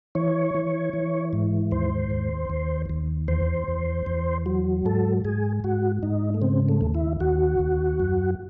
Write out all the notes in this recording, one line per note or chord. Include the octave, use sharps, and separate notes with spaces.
E3 C#5
E3
E3
G#2
D#2 C5
D#2
D#2
D#2
E2 C5
E2
E2
F#3
G#2 A4
G#2 G#4
G#2 F#4
G#2 D#4
A3
C#3 C4
A3
D#2
E4
D#2 F#4
D#2
F#2